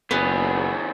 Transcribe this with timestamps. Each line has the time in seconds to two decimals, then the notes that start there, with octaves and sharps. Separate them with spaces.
0.11 F#1 D#2 B3 G#4